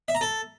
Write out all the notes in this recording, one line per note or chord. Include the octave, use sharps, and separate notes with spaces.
E5
A#5
A4